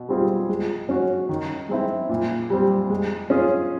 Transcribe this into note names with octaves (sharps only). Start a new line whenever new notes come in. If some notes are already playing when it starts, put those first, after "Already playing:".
Already playing: B2
G3 C4 F4 G#4
G#3
C#4 F#4
D#3
G#3 C4 E4
A#2
G3 C4
G#3
C#4 F4 G#4